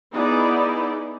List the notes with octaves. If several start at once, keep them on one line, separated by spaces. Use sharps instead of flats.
B3 D#4 E4 G#4 D5